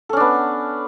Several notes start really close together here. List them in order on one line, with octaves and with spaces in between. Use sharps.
A4 C#4 D4 B3